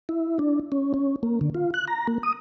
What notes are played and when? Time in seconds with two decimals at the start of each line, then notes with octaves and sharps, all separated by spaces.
0.09 E4
0.39 D4
0.72 C#4
0.94 C#4
1.23 A#3
1.41 D3
1.55 F4
1.74 F#6
1.88 A#5
2.08 A#3
2.23 D#6